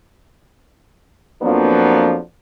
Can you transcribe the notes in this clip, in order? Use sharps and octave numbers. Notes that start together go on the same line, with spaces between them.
F2 F3 F#3 A#3 B3 D4